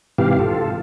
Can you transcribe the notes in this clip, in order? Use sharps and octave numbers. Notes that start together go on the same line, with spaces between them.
G#2 C3 E3 G4 F5
F4 A4